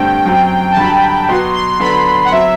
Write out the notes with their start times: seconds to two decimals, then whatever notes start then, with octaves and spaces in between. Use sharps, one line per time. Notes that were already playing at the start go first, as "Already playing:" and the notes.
Already playing: G2 D3 A3 C4 G5
0.26 F#2 F#3 C4
0.71 A5
0.77 G2 D3 F#3 B5
1.28 B2 F#3 B3 F#4 B4 C6
1.54 C6
1.71 C6
1.80 D3 F#3 B3 D4 A4 B5
2.25 F#5
2.32 F#3 C4 E5